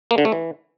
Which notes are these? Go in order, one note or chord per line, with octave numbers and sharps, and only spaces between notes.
A#3
D3
A3
E3